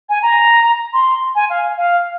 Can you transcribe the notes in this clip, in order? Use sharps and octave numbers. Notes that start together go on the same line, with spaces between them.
G#5
A#5
C6
G#5
F5
F5